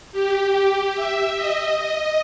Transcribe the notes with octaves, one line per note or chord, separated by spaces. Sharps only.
G4
E5
D#5